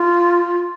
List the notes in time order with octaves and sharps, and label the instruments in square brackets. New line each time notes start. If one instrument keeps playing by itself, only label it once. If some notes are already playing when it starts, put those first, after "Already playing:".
Already playing: [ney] F4